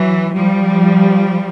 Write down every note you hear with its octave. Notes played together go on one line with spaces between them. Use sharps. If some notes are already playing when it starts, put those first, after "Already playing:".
Already playing: E3 F#3
F3 G3